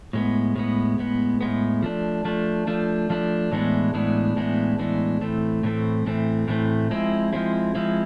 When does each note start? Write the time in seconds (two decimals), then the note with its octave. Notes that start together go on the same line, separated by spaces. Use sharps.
0.13 A2 G#3 B3
0.56 A2 G#3 B3
0.98 A2 G#3 B3
1.41 A2 G#3 B3
1.83 F3 A3 D4
2.25 F3 A3 D4
2.67 F3 A3 D4
3.10 F3 A3 D4
3.52 A2 E3 G#3 B3 D4
3.94 A2 E3 G#3 B3 D4
4.36 A2 E3 G#3 B3 D4
4.78 A2 E3 G#3 B3 D4
5.21 A2 E3 A3 C4
5.63 A2 E3 A3 C4
6.06 A2 E3 A3 C4
6.48 A2 E3 A3 C4
6.91 F3 G#3 C4 E4
7.33 F3 G#3 C4 E4
7.75 F3 G#3 C4 E4